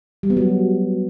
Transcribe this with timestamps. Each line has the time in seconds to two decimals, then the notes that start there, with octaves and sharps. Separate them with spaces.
0.23 G3
0.30 B3
0.37 F#3